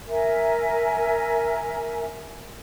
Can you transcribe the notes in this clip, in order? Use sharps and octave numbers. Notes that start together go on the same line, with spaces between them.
A#4 E5 G#5